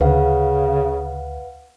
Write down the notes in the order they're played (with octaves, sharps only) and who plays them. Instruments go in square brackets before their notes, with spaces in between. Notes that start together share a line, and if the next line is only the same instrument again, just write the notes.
[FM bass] D2 [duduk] C#3 [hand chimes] B4 F5 F#5